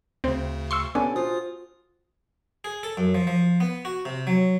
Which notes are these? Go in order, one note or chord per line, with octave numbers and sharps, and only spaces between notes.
D2 C#3 C4 C5
C6 C#6 E6
B3 C#4 D4 G4 A4 G#5
F4 F#4 C5 D#6
G#4
A4
F#2
F3
F3
B3
F#4
C3
F#3